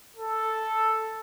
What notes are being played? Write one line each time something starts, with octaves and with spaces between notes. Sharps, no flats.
A4